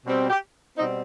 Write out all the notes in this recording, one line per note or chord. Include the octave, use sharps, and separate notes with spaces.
B2 G3 C4
G4
B2 G3 C4 D#4